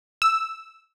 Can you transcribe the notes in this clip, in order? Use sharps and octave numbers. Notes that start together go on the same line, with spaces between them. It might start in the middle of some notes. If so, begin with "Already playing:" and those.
E6